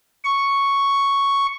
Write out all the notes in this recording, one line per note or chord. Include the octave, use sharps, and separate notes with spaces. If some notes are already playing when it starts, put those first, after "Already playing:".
C#6